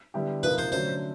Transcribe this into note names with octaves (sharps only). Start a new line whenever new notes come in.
D3 G3 B3 E4 G4
C3 F3 A#3 D#4 B4
C5
D3 F#3 A3 C#4 C5